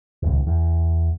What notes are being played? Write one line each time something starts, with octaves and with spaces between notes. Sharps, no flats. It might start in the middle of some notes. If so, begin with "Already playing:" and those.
D#1 C#2
E2